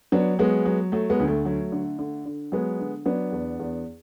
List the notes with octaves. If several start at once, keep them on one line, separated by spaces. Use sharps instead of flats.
F#3 B3 D4
F#3 G#3 B3
F#3
F#3 A3
G#3 B3
D2
A3
F#3 A3
D3
D3
D3
F#3 G#3 B3
D3
F#3 B3 D4
E2
E2